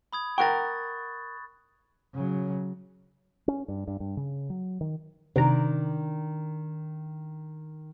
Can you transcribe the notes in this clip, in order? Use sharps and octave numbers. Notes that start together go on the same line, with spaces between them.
B5 D#6 G#6
A#4 F#5 G5 C#6 F#6 A6
C#3 F#3
C#4
G2
G2
G2
C#3
F#3
D#3
C3 D#3 D4 A#5